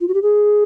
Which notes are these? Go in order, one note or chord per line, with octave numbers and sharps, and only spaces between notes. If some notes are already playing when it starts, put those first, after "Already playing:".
F4
F#4
G4
G#4